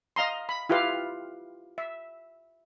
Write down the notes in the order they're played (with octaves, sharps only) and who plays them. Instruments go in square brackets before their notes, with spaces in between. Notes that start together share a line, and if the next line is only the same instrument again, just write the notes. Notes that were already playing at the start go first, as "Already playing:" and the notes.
[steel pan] D#5 F5 A#5 C6
B5
E4 F4 G4 B4 F5
E5